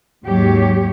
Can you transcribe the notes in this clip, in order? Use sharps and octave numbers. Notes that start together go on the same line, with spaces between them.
D#2 G#2 F#3 G4 C#5